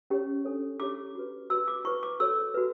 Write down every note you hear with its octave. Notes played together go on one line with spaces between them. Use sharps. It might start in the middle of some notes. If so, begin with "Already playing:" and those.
C#4 G4 C#5
D4 A4 C#5
E4 G4 C#5 D6
F#4 B4
F#4 B4 E6
D6
E4 B4 C#6
D6
F#4 A4 C#5 E6
F#4 B4